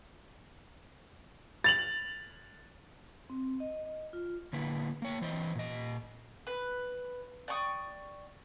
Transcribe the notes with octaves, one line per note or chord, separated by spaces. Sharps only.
A6 F7 F#7
C4
D#5
D#5
F4
D3 A#3 E4 B4
A#3 C#5
E3 C5 D#5
A#2 D#5
B4
D5 G5 C#6 D#6